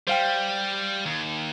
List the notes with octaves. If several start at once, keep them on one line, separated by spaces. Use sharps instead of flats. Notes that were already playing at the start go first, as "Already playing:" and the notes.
G3 C5 F5 G5
D#2